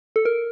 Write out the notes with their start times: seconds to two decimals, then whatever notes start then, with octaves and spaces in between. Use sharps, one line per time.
0.16 A4
0.25 A#4